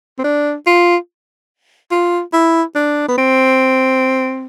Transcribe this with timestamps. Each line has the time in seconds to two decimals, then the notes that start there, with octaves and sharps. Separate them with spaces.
0.18 C4
0.24 D4
0.67 F4
1.91 F4
2.33 E4
2.75 D4
3.08 B3
3.17 C4